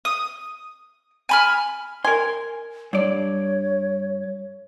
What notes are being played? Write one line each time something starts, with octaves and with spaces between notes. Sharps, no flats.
D#6
G#5 B5 F6
A#4 G#5 C6
G2 C#5 D5